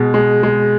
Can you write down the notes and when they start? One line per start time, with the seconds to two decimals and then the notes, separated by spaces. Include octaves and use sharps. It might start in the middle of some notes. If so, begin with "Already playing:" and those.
Already playing: B2 G#3
0.14 G#3
0.43 G#3